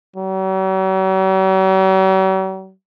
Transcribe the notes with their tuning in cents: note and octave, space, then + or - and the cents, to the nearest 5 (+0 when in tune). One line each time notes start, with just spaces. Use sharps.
F#3 +45